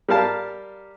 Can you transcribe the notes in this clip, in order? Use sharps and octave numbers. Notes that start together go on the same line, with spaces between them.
G3 A#4 F5 A5